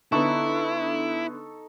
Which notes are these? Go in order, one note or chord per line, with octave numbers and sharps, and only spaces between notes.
D3 B3 D#4 E4 A4 C#6